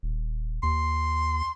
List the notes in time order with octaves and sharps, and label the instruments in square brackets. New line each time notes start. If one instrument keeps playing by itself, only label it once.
[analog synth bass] D#1
[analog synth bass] D#2 [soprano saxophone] C6